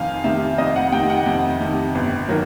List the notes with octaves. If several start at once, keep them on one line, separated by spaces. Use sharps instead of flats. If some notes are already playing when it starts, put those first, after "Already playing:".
Already playing: F2 C3 D#3 F5 G#5
C3 D#3 E5
F2 D#5
F#5
C3 D#3 G5
F#5
F2
C3 D#3
G1
D#3 F#3 A#3